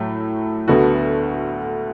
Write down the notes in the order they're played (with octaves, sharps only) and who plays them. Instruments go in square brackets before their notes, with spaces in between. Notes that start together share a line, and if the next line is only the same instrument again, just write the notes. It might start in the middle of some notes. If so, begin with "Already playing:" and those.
Already playing: [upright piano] A2 F#3 A3
D2 D3 B3 F#4 A4